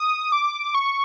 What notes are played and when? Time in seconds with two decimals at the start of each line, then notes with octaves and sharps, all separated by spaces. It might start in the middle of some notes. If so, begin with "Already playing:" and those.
Already playing: D#6
0.32 D6
0.75 C#6